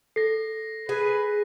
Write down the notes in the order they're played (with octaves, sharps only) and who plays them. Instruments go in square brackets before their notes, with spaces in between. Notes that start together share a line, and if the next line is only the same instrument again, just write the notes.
[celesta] A4 [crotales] A#6 C7
[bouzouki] G#4 [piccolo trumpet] B4